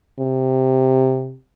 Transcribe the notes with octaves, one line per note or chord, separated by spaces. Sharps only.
C3